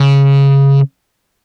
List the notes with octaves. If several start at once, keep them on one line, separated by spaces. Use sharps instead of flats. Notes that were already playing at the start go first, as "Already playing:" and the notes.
Already playing: C#3